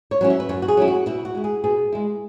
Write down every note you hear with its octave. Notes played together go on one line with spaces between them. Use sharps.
C#5
F#3 C#4 E4
E5
B4
F#2 C#5
F#4
G#4
F#3 C#4 E4
F#4
B2 E4
F#4
G#3 E4
G#4
B2 G#4
G#3 E4